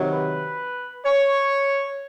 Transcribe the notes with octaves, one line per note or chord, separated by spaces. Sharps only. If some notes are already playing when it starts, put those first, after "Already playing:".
Already playing: C3 D#3 F#3
B4
C#5